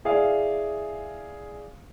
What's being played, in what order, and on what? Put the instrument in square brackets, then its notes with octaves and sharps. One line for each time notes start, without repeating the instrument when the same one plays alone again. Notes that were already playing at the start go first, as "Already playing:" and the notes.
[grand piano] E4 G#4 D5 F5